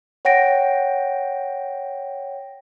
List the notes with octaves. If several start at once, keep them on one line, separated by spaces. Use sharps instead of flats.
C#5 F#5 G5 A#6 D7